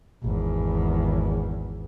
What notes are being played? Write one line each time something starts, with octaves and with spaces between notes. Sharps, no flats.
G#1 E2